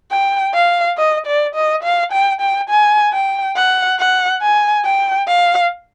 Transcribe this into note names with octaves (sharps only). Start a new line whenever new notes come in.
G5
F5
D#5
D5
D#5
F5
G5
G5
G#5
G5
F#5
F#5
G#5
G5
F5